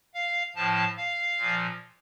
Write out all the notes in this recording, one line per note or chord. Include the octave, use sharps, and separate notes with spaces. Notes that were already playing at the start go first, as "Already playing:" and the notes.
F5
A2 F3 A5
F5
A#2
F3